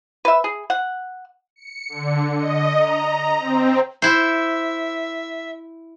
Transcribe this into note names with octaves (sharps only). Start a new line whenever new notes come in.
B4 E5
G#4
F#5
C#7
D3
D#5
A#5
A#5
C4
E4 C5 E5